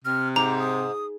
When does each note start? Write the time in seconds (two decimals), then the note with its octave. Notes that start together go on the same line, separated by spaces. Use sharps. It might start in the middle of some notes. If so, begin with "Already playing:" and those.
0.05 C3 F6
0.36 G#2 A#5 D6
0.59 D#6